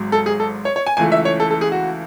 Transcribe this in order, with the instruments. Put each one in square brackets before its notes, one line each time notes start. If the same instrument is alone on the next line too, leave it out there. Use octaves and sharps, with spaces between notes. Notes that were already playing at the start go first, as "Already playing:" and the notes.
Already playing: [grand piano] G#1 G#2 F#3
A4
G#4
A4
C#5
C#5
G#5
C#2 C#3 E3 A3 G#5
E5
C#5
A4
A4
G#4
F#4